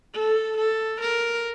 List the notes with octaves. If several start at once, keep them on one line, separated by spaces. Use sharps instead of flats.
A4
A4
A#4